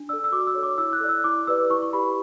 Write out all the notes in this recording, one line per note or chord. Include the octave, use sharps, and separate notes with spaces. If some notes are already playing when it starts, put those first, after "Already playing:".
Already playing: D4
A4 D5 E6
E6
F#4 D6
E6
A4 C#5
D6
E4 E6
F#6
A4 D5
E6
E4 D6
G4 B4 D5 E6
E4 C#6
C#6
G4 B4 D5 B5